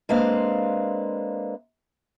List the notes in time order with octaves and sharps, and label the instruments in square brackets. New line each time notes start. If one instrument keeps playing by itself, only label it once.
[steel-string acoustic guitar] G#3 A#3 C4 D4 B4 F5